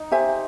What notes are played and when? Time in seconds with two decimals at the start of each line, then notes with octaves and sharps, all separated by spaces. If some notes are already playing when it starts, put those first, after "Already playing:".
Already playing: D#4
0.11 G4 C5 E5 G#5